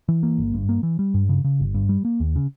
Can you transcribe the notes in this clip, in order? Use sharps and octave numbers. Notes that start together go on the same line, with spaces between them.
E3
A#3
G1
G2
A#3
E3
G3
G2
C#3
C#3
G1
G2
G3
A#3
D#2
C#3